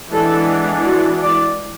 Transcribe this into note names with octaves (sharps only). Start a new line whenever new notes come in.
E3 G#3 B3 D4 A4
F#4
D5